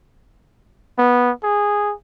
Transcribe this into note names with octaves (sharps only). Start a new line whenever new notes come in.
B3
G#4